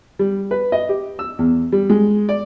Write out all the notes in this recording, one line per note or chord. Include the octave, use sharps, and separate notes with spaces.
G3
B4
D#5
G4
E6
E2
G3
G#3
D5